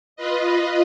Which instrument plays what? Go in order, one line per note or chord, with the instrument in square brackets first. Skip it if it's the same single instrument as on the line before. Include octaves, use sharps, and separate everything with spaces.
[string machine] F4 B4 D#5